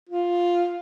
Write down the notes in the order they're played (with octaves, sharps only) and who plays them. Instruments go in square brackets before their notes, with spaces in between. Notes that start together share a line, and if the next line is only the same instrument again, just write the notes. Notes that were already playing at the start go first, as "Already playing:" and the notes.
[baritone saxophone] F4